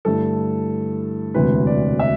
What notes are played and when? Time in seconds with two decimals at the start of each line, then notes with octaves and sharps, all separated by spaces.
0.05 G2 D3 A3 E4 A4
1.34 E1 D2 C3 E3 B4
1.67 D5
2.00 E5